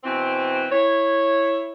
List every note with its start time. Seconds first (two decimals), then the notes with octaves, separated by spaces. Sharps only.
0.04 B2 E3 C4
0.71 E4 C#5